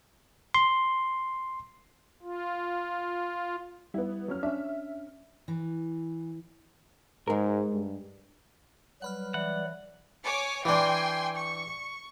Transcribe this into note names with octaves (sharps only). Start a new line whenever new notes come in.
C6
F4
G3 B3 E4
F#3 C#4 F6
C#4 D4 E5
E3
G#2 G#3 A#4
G2
F#3 G3 B4 F#5 B5 F6
E3 D5 F#5
C#5 G#5 D6
E3 D4 G5 G#5 C6
C#6